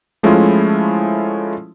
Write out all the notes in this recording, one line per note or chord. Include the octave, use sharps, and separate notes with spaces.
F3 G#3 A3 C#4 E4 F4